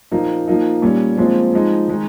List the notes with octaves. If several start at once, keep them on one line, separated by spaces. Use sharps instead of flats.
A#2 F3 A#3 D#4
F3 A#3 D#4
A#2 G3 C#4
A#2 F3 G#3 C4
F3 G#3 D#4
D#3 G#3 D#4